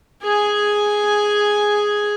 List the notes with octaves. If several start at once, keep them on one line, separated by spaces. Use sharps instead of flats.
G#4 G#5